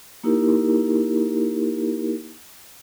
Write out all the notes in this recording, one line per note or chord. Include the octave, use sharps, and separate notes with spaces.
A#3 D#4 E4 G4 A#4